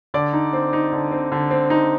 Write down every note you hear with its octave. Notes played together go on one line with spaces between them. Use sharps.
D3 D5
D#4
C4
D#4
D3
C4
D3
C4
D#4